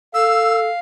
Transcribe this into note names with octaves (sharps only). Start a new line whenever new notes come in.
A4 F5 E6